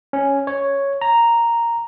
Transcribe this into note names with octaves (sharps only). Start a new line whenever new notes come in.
C#4
C#5
A#5